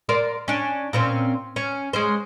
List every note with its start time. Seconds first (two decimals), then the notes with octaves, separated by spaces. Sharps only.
0.09 A#4 C5 D5
0.48 C#4 D4
0.93 A#2 C4 C#4
1.56 C#4
1.93 G#3 C#4 C5